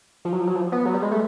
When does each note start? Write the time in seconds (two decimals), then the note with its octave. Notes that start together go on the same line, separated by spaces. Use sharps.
0.25 F3
0.33 F#3
0.40 F3
0.47 F#3
0.55 F3
0.72 B3
0.86 F#3
0.94 G3
1.02 G#3
1.11 A3